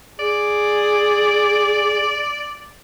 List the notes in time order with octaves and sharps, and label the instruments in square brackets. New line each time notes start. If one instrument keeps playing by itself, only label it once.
[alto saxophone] G#4 [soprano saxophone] D5